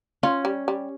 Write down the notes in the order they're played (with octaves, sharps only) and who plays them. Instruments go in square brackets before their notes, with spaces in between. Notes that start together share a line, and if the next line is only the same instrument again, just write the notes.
[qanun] C#4 [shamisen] F4
[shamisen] G3
G3